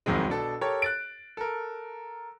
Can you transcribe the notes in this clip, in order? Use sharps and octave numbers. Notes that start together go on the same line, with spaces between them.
C2 F2 C3 D#3 F#3 G#3
B2 D4 A4
G4 A4 A#4 C#5
F#6 A6 D7
A4 A#4